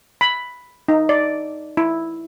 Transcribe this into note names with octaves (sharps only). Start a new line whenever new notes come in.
B5
D#4
D5
E4